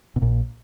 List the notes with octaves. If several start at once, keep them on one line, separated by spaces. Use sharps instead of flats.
B2
A#1 A#2